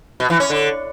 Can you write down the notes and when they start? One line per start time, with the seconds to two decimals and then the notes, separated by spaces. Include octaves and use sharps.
0.20 B2
0.30 E3
0.40 C#4
0.50 D3